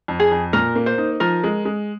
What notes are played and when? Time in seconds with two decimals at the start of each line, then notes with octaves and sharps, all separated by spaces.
0.08 F2
0.20 G#4
0.31 F2
0.53 A#2 A#4
0.75 A#3
0.86 C5
0.98 D#4
1.20 F3 A#4
1.44 G#3
1.65 G#3